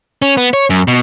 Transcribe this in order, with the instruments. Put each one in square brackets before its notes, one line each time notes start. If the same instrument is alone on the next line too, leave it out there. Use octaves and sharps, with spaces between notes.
[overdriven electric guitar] C#4
B3
C#5
F#2
B2